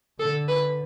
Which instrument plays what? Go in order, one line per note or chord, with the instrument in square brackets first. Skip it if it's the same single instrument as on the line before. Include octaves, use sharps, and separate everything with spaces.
[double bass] D3 [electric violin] A4
[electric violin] B4